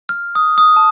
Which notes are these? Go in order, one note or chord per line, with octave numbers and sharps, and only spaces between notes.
F6
D#6
D#6
A5